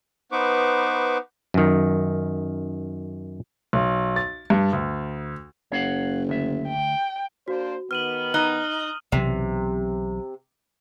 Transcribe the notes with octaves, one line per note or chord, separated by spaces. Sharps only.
B3 D#4 B4 C5 C#6 D6
F#2 D#3
B1
A6
G2
D2
F#1 C#5 F5 F#5
D2 E5
G5
A#3 D4 F#4 C5
D#3 B3 F6 D#7 F#7
D#4 D#6 F#6 G7
B1 C3 E3 F#3